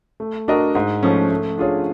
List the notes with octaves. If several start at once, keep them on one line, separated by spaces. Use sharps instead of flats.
A3
D4 F#4 A#4 D#5
G#2
F3 A3 C#4
A3
D4 F4 G#4 C#5